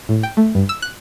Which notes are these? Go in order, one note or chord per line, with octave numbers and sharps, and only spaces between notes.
A2
G5
A3
G2
E6
F#6